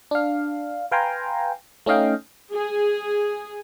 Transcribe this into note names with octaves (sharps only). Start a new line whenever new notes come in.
D4 F5
B4 F5 G5 G#5 A#5 C6
A3 C#4 D#4 D#5 F5 G5
G#4